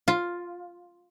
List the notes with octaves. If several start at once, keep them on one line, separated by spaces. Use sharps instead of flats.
F4